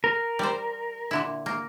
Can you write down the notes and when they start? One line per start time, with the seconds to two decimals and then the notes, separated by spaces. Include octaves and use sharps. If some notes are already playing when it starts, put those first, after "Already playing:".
0.04 A#4
0.39 G3 C5
1.11 A#2 D3 E4
1.46 A#3